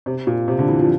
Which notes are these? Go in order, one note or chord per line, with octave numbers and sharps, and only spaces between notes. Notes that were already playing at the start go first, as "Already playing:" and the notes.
C3
A#2
C3
D3
E3
F3